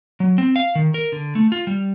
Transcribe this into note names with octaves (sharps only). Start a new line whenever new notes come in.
F#3
C4
F5
D#3
A#4
D3
A3
F4
G3